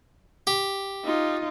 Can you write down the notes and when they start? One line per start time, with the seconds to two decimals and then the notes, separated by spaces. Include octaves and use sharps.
0.47 G4
1.05 D#4 F4